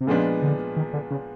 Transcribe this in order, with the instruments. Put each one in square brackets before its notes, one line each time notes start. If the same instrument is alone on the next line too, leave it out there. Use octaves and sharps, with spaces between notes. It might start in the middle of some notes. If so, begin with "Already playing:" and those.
[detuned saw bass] C3
[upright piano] A#2 F3 G#3 B3 D4 [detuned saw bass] C#3
[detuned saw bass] D3
D#3
D3
C#3